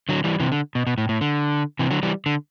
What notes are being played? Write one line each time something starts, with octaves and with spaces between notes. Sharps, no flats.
D3 F#3
E3 G3
C3 E3
D3
B2
B2
A2
A2
D3
C3 E3
D3 F#3
E3 G3
D3